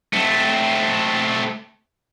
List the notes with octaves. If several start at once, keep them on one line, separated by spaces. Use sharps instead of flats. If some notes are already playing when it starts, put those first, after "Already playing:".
A3 C4